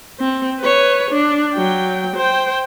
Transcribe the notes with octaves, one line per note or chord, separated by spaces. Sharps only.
C4
B4 C#5
D4
F#3 G5
C5 G5